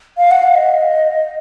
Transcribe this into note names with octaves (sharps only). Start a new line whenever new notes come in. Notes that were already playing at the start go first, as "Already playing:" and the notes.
F5
F#5
F5
D#5